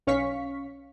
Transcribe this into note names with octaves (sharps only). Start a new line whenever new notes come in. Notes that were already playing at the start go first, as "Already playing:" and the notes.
B1 C#4 F5 C#6 B6